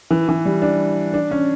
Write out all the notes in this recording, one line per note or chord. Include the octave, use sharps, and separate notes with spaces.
E3
E3
G3
D4
D4
C#4